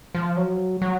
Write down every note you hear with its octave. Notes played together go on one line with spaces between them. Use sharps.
F3
F#3
F#3